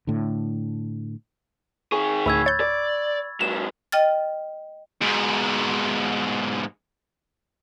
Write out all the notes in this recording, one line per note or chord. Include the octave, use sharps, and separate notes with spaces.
A2 D3
D#3 G#4 C#6
D2 A2 B5 E6 G#6
C#5 G6 A6
D5
G#2 F#3 E7
D#5 G5 F6 A6
G#2 B2